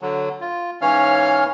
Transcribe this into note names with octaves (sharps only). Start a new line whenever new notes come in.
D3 F#3
F4
G#2 E3 C#4 C#5 F5 F6